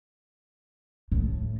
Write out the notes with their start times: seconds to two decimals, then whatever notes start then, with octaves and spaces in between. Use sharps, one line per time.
1.12 A2